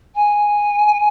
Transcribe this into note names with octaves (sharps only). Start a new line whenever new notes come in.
G#5